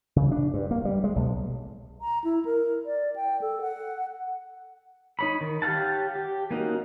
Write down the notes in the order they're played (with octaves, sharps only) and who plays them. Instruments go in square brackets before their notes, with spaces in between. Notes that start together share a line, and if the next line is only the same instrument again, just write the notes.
[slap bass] C#3
D4
G2
A#3
G3
G#3
B1
[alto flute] A#5
E4
A#4
D5
G5
A4
F#5
[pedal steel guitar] D#4 C#5 B5
D#3
G4 C#5 F5 F#5 A5
G4
A#3 C#4 D#4 F#4